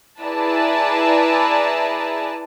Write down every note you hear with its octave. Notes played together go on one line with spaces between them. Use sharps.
E4 G#4 B4 D5 A5 A#5